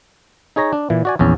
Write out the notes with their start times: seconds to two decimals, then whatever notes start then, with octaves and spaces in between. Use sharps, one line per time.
0.56 D#4 G#4 C#5 A#5
0.73 D4
0.90 A#2 E3
1.05 F#4 D5 G#5
1.19 A#1 E2 C#4